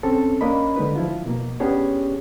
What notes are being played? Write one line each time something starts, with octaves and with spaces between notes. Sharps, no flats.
C2 C4 C#4 A4
A#3 C#4 D4 A#4 D#5 B5
D3 G#3 D#4 B4
F3 E4 F4
B2 A#3
B3 C#4 D4 G4 G#4 C#5